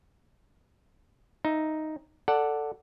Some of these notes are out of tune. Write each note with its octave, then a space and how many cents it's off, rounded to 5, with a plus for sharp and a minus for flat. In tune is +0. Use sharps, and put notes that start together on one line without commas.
D#4 +0 E5 +0
A4 +10 D5 +0 F#5 +0